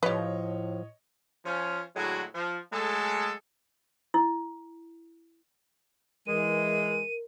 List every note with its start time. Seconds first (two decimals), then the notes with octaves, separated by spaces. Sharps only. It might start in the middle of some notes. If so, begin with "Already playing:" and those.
0.03 A2 F3 G4 B4 C#5 D#5
1.45 F3 C#4
1.96 A2 D3 F#3 G#3 E4 F#4
2.35 F3
2.72 F#3 G#3 A3 G#4 A4
4.14 E4
6.27 E3 G#3 A#4 D#7